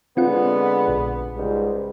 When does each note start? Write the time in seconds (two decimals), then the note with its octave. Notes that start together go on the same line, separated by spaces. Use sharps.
0.17 D3 G#3 B3 C4 F4 F#5
0.88 A#1
1.36 C#2 G#2 G3